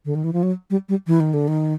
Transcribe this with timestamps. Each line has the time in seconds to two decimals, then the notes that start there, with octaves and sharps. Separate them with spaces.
0.05 D3
0.15 D#3
0.24 E3
0.33 F3
0.43 F#3
0.70 G3
0.89 G3
1.07 E3
1.20 D#3
1.34 D3
1.48 D#3